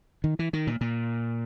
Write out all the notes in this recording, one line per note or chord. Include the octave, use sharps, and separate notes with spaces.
D#3
E3
D#3
A#2
A#2